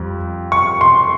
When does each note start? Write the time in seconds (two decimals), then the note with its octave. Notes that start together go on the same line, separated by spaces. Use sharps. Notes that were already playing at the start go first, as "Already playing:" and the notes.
Already playing: F2 G3
0.52 C#6
0.81 C6